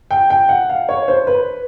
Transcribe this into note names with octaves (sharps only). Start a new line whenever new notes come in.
G5
G5
F#5
F5
C#5
C5
B4